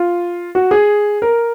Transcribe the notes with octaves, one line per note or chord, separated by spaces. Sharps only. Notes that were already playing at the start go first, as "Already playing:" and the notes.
Already playing: F4
F#4
G#4
A#4